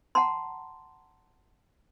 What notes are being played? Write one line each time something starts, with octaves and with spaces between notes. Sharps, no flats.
F#5 A5 A#5 C6